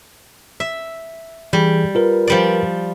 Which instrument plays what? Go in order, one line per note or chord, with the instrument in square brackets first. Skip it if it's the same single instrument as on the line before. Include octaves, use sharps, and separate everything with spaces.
[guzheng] E5
[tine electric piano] E3 G#4 [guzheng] G3
[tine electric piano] F4 A#4 B4
[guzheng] F3 G3 D5